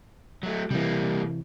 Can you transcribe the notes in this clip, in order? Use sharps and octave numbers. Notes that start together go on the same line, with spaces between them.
F#3 A3
C3 E3 G3 A#3